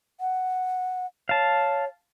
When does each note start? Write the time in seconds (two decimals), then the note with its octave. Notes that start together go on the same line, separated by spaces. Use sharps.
0.20 F#5
1.29 C#5 F5 A5